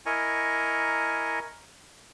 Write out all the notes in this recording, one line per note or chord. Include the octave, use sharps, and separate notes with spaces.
E4 A#4 D#5 G#5 A#5 C#6